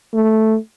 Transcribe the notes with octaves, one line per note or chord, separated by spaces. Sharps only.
A3